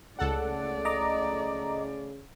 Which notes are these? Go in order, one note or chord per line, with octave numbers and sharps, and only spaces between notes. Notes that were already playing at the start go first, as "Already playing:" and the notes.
C#2 C#3 A3 A4 D5 F#5
D#5 A#5 D6